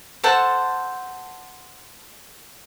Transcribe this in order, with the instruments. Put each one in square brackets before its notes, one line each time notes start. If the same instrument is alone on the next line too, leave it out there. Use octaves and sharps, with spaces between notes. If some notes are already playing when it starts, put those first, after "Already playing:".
[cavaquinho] A4 C5 F#5 A5